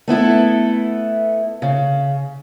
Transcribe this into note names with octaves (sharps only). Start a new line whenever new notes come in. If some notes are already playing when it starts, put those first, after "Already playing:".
A3 B3 E4 A4
C#3